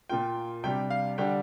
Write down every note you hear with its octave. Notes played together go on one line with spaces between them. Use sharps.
A#2 A#3 F4 G5
C3 G3 D4 G5
F5
D3 G3 D4 G5